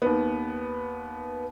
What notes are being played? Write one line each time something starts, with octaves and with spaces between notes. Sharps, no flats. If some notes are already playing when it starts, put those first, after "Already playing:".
D#2 B3